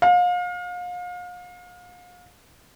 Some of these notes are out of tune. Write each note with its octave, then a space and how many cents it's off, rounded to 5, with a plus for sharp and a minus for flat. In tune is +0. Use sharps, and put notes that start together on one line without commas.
F5 +35